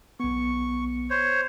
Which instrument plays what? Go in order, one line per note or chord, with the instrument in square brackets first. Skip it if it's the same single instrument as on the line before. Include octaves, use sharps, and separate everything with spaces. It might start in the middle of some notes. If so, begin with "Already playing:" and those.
[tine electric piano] B1 B3 [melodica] C#6
[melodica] C5 C#5